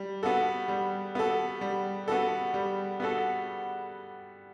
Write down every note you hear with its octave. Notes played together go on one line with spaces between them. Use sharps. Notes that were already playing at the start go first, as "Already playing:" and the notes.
Already playing: G3
B3 F#4 A4
G3
B3 F#4 A4
G3
B3 F#4 A4
G3
B3 F#4 A4